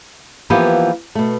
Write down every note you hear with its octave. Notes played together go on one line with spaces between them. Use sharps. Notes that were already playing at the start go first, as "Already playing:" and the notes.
E3 F3 A#3 B3 G4
B2 A3